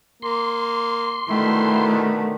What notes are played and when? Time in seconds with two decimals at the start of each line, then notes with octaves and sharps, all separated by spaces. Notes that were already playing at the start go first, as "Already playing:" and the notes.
0.22 A#3 C6
1.29 B2 D3 D#3 A3 E4